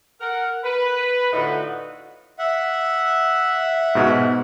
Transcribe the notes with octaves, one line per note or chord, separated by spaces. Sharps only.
A#4 F#5
B4
A2 D3 D#4 F4 F#4 F#5
E5 F#5
G#2 B2 F#4